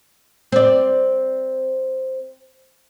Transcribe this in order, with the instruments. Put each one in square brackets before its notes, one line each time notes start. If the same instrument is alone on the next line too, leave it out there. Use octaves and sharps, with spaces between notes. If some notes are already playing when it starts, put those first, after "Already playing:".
[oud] C4 D5